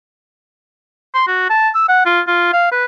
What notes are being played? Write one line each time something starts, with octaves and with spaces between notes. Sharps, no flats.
C6
F#4
A5
E6
F#5
F4
F4
F5
B4